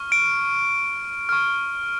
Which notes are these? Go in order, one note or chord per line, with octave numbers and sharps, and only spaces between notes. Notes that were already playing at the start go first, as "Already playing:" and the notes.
Already playing: C#6 F6
D7
C#6 F6